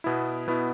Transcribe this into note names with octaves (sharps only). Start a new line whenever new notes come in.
B2 B3 E4
B2 B3 E4